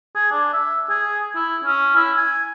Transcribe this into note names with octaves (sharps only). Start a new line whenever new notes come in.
G#4
D4
E5
G#4
E4
C#4
E4
G#5